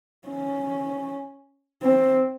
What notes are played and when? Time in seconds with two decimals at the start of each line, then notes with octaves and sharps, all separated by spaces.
0.28 C#4
1.83 C4